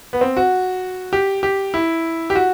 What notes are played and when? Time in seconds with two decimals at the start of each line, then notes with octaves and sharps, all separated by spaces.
0.13 B3
0.21 C4
0.37 F#4
1.13 G4
1.43 G4
1.74 E4
2.30 G4
2.35 F#4